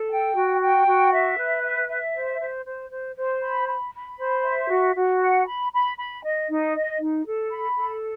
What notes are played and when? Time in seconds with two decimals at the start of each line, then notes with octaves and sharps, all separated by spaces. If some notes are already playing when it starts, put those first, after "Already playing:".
Already playing: A4
0.10 G5
0.36 F#4
0.61 G5
0.87 F#4
1.12 E5
1.38 B4
1.63 E5
1.89 E5
2.15 C5
2.41 C5
2.66 C5
2.91 C5
3.17 C5
3.42 B5
3.68 B5
3.94 B5
4.19 C5
4.44 E5
4.70 F#4
4.95 F#4
5.21 F#5
5.47 B5
5.73 B5
5.98 B5
6.23 D#5
6.49 D#4
6.74 D#5
7.00 D#4
7.26 A4
7.51 B5
7.76 A4